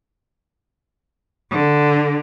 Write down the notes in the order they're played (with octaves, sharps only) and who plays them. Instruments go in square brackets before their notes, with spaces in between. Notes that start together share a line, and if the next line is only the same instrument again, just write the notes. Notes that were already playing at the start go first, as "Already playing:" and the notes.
[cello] D3